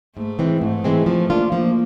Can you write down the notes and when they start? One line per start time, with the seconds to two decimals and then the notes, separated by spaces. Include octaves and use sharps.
0.16 G#2 A3
0.39 E3 G#3 C4
0.61 G#2 A3
0.84 E3 G#3 C4
1.06 F3
1.30 A#3 D4 F4
1.52 F3 A#3